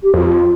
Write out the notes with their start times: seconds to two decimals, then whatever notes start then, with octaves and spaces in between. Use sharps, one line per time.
0.02 G4
0.13 F2 F4 G4